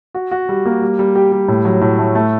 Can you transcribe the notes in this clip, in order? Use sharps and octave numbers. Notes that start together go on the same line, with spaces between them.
F#4
F#4
G3
A#3
G3
G3
G4
G3
A2
F#3
A2
A3
A3